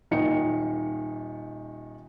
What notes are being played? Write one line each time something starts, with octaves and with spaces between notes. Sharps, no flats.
D#1 D#3 D#4 C#7